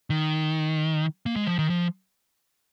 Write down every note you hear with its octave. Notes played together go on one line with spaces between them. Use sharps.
D#3
A#3
G#3
F3
D#3
F3